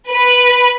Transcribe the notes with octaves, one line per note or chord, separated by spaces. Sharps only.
B4